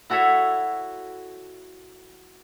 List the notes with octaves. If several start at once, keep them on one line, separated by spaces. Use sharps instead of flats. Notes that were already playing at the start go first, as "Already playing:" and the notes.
E4 F#4 A4 C#5 E5